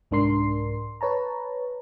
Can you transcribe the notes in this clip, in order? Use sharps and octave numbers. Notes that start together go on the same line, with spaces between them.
C2 G#2 D4 A#4 C6 C7
B4 C#5 A5 A#5